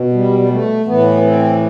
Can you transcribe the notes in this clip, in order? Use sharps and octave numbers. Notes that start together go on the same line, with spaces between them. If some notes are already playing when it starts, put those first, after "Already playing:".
Already playing: B2
G3
G3
A3
A2 E3 B3
C4